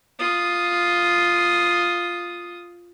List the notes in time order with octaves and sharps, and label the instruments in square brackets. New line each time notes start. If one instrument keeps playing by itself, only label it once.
[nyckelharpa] F4 D#6